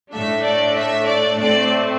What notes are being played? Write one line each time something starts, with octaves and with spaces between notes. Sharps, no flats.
A2 A3 D4 E5
D5
E5
D5
A2 A3 C4 D5